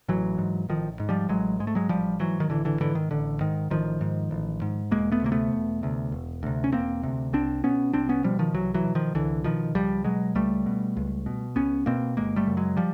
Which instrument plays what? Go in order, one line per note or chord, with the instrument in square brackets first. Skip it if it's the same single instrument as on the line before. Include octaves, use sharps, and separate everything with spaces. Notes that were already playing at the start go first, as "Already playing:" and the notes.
[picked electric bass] A1 E3 F#3
G#2
A1 D#3 F3
G#2
F3 G3
A1 F#3 G#3
G#2 G#3
A3
F#3 G#3
A1 F3 G3
G#2 E3 F#3
D#3
A1 D3 E3
D3 E3
G#2 D3 E3
D#3
A1 D3
G#2 D#3
A1 D#3 F3
G#2
A1
G#2
E1 G#3 A#3
A3 B3
D2 C3 A#3
A3 B3
E1
D2 C3
E1
D2 C3
C#4
E1 A#3 C4
D2 C3
C2 C4 D4
B2 B3 C#4
C2 C4 D4
B3 C#4
B2 F3 G3
D#3 F3
C2 E3 F#3
E3 F#3
B2
D#3 F3
C2 D3 E3
B2 D#3 F3
C#2 F3 G3
B2 F#3 G#3
C#2 G3 A3
B2
C#2
B2
C#2 B3 C#4
B2 A#3 C4
G1 G#3 A#3
G3 A3
F#2 C#3
F#3 G#3
F3 G3